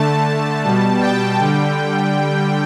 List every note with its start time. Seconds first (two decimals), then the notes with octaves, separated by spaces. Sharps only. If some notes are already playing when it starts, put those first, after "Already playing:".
Already playing: D3 A3 A5
0.64 B2 G3
1.00 G5
1.39 D3 G3